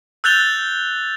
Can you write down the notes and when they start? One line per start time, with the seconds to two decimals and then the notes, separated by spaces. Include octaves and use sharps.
0.24 E6 F#6 G6 A6 F7 G7